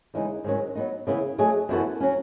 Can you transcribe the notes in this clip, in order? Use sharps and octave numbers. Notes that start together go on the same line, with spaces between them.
E2 C#3 E3 G#3 D#4
G#2 D#3 F#3 C#4
F#3 B3 D#4
C#3 E3 B3 E4
F#3 A3 D#4 G#4
F#2 E3 B3 F#4 A4
F#3 C#4